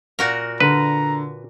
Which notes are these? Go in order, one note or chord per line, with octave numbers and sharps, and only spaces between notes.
A#2 F#4 A#4
D3 B4 A#5